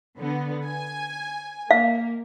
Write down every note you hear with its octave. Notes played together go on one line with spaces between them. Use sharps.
D3 B3
G#5
A#3 F5